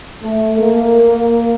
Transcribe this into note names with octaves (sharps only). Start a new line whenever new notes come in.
A3
A#3